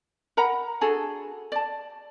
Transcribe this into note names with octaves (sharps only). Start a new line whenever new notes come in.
A#4 F#5 A#5 B5
D4 F#4 G#4 A4
D5 A5